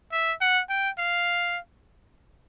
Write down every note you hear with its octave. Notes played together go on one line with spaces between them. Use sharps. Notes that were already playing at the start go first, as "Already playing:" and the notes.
E5
F#5
G5
F5